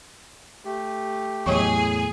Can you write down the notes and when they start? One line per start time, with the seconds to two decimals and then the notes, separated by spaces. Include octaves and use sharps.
0.65 A3 G4
1.46 E2 A2 F#3 G#4 C#5 C#6